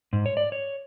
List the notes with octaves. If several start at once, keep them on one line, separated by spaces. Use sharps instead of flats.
G#2
C#5
D5
C#5